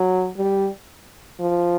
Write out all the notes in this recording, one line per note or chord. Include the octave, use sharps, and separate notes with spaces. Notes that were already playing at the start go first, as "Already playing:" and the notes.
Already playing: F#3
G3
F3